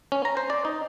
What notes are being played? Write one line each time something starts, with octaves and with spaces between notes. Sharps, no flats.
C#4
A#5
C5
D5
D#4